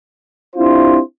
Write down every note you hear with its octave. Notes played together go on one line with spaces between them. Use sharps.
C4 D4 E4 F4 G4 C5